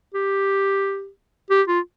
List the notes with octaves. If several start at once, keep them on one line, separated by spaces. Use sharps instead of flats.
G4
G4
F4